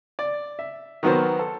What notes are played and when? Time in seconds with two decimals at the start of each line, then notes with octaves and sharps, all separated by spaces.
0.19 D5
0.59 E5
1.03 D#3 F#3 B3 F#4 A#4 C5
1.39 A4